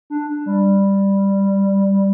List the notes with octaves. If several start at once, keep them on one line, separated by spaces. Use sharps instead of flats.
D4
G3